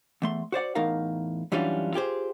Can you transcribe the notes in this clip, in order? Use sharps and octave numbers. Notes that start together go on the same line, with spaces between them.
E2 A3 C6
F#4 C5 D5 F#5
E2 A2 D#4 A#4 F5
F#2 E3 G3 C#4 D4 F4
F4 G4 G#4 C5